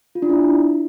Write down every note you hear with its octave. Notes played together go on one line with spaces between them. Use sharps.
F4
D4
E4